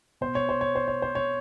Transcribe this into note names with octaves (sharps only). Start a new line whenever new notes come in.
B2 C5
C#5
C5
C#5
C5
C#5
C5
C#5